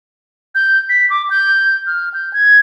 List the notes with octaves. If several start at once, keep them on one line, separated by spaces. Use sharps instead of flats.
G6
B6
D6
G6
F6
G6
G#6